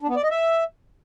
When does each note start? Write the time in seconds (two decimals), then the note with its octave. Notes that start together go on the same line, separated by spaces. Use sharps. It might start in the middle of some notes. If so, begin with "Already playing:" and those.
0.01 D4
0.09 B3
0.16 D5
0.23 D#5
0.31 E5